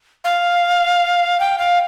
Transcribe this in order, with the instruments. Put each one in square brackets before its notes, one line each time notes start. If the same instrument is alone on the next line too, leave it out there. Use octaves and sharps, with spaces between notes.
[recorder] F5
G5
F5